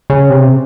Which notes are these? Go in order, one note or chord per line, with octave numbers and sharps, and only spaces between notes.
C#3
C3